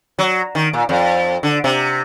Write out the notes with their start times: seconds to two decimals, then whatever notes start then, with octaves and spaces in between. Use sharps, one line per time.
0.19 F#3
0.55 D#3
0.73 A#2
0.89 F2
1.43 D3
1.64 C3